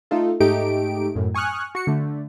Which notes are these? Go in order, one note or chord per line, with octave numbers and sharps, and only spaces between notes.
A3 D#4 F4 A4
G#2 A3 D#4 G4 D7
F#2 A2
G#5 C#6 D#6 F6 F#6
F#4 C#7
D3 A3